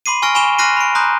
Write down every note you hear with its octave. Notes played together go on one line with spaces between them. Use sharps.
B5 C6 D6 C7 D#7
G#5 C#6 F6 A#6 D7
G#5 B5 C#6 D6 E7 G7
C6 F6 F#6 A#6 C7 D#7
B5 D7
A#5 C6 D#6 F#6 G6